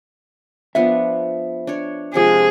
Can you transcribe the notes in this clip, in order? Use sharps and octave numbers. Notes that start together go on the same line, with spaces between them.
F3 B3 D4 E5
D4 C#5
C3 F3 G#3 G#4